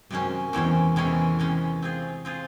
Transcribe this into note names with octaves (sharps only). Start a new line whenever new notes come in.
F#2 C3 D#3 F#3 G#3 C#4
E2 C3 D#3 E3 G#3 C#4
E2 C3 D#3 E3 G#3 C#4
C3 D#3 G#3 C#4
C4 F4 G#4
C4 F4 G#4